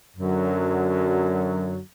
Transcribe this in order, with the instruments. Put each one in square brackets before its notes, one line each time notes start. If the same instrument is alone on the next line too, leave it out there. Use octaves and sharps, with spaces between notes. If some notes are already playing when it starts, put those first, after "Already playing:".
[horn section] F#2 D3 F#3